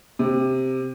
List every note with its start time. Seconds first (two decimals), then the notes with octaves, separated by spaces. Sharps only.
0.19 C3